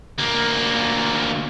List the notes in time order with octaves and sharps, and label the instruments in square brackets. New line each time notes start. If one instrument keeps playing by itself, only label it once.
[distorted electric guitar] D2 A#3